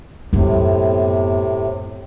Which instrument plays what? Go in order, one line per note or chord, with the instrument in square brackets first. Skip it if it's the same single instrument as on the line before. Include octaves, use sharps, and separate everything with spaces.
[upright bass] F#2 B3 [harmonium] A2 C3